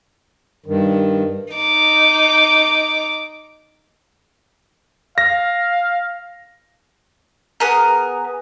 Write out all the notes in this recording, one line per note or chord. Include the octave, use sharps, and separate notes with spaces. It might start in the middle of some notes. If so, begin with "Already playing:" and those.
G2 D#3
D#4 D6
F5 A#6
B3 G#4 A#4